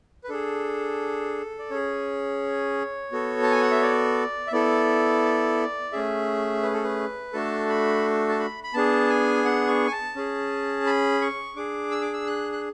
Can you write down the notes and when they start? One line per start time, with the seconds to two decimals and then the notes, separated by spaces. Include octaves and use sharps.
0.24 B4
0.29 D4 G#4 A4
1.59 D5
1.70 C#4 G#4 C#5
3.12 B3 F#4 A4
3.43 A5
3.52 G#5
3.62 F#5
3.71 E5
3.82 D5
4.47 E5
4.52 B3 E4 A4 D5
5.92 A3 C#4 G#4 E5
6.63 B4
6.74 A4
6.84 B4
7.33 A3 D4 F#4 A4 A5
7.69 B5
8.29 A5
8.39 B5
8.64 B5
8.74 B3 D4 G#4 A5
9.09 G#5
9.45 F#5
9.68 C#6
9.87 G#5
9.92 A5
10.16 C#4 G#4
10.86 B5
11.21 C#6
11.56 D4 G#4 D6
11.91 E6
12.02 D6
12.13 E6
12.27 F#6
12.52 F#6